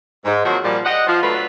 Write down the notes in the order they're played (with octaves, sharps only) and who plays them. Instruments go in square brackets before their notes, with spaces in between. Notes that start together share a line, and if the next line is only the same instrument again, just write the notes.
[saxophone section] G#2
D#3 F3 F#3 A#3 C4 F#4
A#2 F3 G3
G4 D#5 F#5
F3
D3 F#3 A3 F4 B4